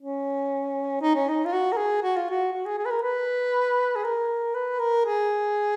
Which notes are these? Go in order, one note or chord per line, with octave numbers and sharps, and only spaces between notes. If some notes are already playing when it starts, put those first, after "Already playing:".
C#4
D#4
C#4
D#4
F4
F#4
A#4
G#4
F#4
F4
F#4
F#4
G#4
G#4
B4
A#4
B4
G#4
A#4
B4
A#4
G#4